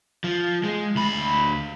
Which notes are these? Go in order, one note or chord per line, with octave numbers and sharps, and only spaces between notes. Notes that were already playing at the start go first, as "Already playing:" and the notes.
F3
G#3
D2 B5